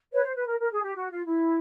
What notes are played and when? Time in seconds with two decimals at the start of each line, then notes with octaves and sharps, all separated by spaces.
0.12 B4 C#5
0.23 C5
0.36 B4
0.48 A#4
0.59 A#4
0.71 G#4
0.83 G4
0.94 F#4
1.10 F4
1.25 E4